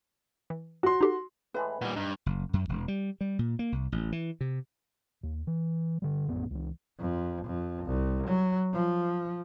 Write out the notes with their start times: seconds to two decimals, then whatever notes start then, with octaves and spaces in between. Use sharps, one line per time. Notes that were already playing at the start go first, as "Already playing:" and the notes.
0.50 E3
0.83 F#4 C6
1.01 D#4 G4 A4
1.54 A2 E3 G#3 B4 B5
1.81 A#2 G3 B3 D#5
1.96 G2 D#4
2.26 F#1
2.53 F#2
2.69 E1
2.88 G3
3.21 G3
3.39 A#2
3.59 A#3
3.72 C2
3.92 A1
4.12 E3
4.41 C3
5.23 D#2
5.47 E3
6.02 D3 G3
6.27 A1 F2 B3
6.51 C#2 E3
6.99 F2
7.45 F2
7.85 C2
8.27 F#3
8.73 F3